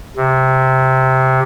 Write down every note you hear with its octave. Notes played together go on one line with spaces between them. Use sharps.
C3